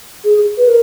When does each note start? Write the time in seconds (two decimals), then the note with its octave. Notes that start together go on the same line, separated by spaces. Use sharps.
0.24 G#4
0.58 B4
0.68 A#4